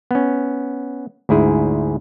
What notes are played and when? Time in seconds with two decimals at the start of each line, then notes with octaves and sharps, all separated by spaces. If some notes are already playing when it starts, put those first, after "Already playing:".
0.11 B3 C#4
1.29 D2 G#2 E4 G#4